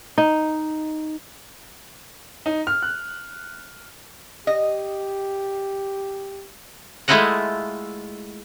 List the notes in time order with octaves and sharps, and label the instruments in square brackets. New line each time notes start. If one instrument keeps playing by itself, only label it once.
[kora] D#4
[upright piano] D#4
F6
F#6
[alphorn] G4 [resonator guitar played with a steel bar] D#5
[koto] G#3 A3 E4 F4 D#5 F#5